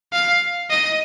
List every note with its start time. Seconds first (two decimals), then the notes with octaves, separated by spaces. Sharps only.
0.13 F5
0.70 D#5